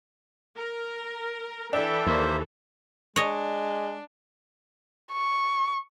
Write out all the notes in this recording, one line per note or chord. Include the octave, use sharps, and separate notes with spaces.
A#4
E3 D4 A4 E5 G5
D#2 A#3 C5 E5
G#3 D4 C#5 D#5
C#6